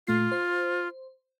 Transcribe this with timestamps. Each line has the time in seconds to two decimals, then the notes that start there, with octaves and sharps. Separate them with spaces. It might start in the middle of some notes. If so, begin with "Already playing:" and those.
0.07 A#2 A3 F4 C7
0.32 C5